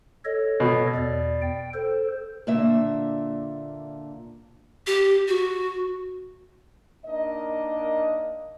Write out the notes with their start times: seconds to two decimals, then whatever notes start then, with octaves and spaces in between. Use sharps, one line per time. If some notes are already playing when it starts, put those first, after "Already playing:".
0.25 A4 C#5 D#5
0.60 B2
0.96 E2 D5
1.42 G5
1.74 A4 C5
2.47 A#2 D3 A#3 E5
4.87 G4
5.28 F#4
7.05 A#3 D4 D#4 A#4 D#5